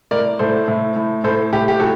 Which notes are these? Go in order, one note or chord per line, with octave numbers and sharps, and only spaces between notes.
A2 A#4 D5
A2 A4 C5
A2
A2
A2 A4 C5
A2 G4
G4
A2 F#4 A4